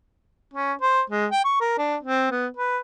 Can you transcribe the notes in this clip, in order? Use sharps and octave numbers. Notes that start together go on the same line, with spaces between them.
C#4
C5
G#3
G5
C#6
A#4
D4
C4
B3
B4